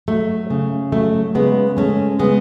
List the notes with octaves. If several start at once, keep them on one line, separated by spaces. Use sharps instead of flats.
F#3 A3
C#3
F#3 A3
C#3 G#3 B3
G#3 A3 C#4
C#3 G#3 B3